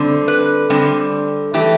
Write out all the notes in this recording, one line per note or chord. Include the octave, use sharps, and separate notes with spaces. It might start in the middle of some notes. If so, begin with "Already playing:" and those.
Already playing: D3 G3 C4
B4
D3 G3 C4
E3 A3 G4